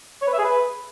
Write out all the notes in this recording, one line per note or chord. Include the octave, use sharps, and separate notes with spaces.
C#5
B4
E5
G#4
B4